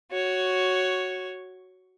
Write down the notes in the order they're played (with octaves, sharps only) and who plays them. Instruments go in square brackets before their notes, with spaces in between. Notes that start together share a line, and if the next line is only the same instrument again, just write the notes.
[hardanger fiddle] F#4 C#5